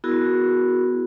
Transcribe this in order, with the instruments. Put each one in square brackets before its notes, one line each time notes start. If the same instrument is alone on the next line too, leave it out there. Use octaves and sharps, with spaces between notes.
[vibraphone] B3 E4 F#4 G#4 A#4